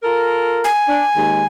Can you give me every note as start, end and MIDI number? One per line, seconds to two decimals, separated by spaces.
0.03 0.65 65
0.03 0.65 69
0.03 0.65 70
0.64 1.46 80
0.88 1.04 62
1.15 1.44 39
1.15 1.44 56